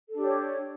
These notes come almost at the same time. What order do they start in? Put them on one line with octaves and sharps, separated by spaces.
A4 D4 G4 C#5